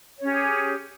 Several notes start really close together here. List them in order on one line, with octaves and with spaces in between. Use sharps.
C#5 C#4 G4 G#4